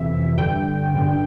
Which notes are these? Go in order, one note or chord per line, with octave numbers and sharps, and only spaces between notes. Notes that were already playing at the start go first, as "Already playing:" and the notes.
Already playing: F2 C3 E3 E5
G2 D3 G5
G2 D3